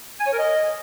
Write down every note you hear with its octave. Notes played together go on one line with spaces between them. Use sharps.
G#5
C#5
A#4
D#5